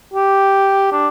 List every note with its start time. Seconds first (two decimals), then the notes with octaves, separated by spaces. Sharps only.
0.14 G4
0.92 D4